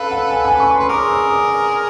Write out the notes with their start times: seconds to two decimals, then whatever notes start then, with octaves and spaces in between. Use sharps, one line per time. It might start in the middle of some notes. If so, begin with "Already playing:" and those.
Already playing: A4 B4 F5
0.11 F#5
0.30 G#5
0.45 G#5
0.60 C#6
0.75 B4 C6
0.89 G#4 A#4 D6
1.10 E6
1.30 D#6